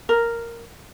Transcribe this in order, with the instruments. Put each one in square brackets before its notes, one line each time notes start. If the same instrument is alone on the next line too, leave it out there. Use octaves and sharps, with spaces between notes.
[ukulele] A#4